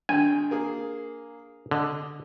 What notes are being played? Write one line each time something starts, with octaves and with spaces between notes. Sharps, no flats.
G#1 D4 G5 G#5
A#3 G#4
D3 D#5